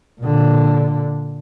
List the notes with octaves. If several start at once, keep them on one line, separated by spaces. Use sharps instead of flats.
A#2 D3